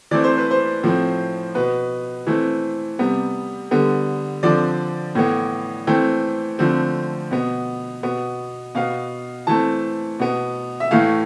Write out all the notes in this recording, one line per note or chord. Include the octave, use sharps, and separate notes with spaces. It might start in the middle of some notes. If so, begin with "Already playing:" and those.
E3 A3 C4 D5
C5
B4
C5
A2 F3 C4
B2 B3 B4
E3 A3 C4
C3 G3 B3
D3 G3 B3
D3 F3 C4 D5
A2 E3 B3
E3 A3 C4 G5
D3 F3 A3 C4
B2 B3
B2 B3
B2 B3 F5
E3 A3 C4 A5
B2 B3
E5
A2 E3 A3 F5